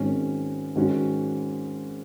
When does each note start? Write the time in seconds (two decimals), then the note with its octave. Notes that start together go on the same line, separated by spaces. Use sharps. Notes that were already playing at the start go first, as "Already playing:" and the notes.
Already playing: G#1 G#2 D#3 F#3 C#4
0.76 G#2 D#3 F#3 C#4 F#4